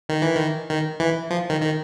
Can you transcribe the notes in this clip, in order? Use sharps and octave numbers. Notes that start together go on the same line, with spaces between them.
D#3
E3
D#3
D#3
E3
F3
D#3
D#3